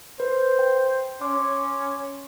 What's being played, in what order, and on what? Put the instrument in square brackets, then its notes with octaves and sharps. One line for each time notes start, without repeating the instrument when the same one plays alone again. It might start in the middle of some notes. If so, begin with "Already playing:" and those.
[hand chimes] B4 [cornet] C5
[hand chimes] G5
[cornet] C#4 [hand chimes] C6 D6